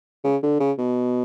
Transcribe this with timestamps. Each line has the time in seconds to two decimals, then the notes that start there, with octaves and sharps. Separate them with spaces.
0.24 C#3
0.42 D3
0.59 C#3
0.78 B2